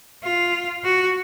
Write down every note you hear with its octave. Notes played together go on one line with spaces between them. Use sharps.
F4
F#4